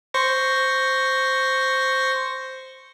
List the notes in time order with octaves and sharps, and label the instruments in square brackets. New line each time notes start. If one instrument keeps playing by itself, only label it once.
[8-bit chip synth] C5 C#6 A#6